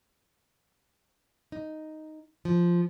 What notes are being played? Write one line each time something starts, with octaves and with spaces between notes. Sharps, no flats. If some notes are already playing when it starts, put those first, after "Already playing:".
D#4
F3